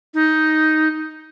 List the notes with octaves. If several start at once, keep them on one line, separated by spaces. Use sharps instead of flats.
D#4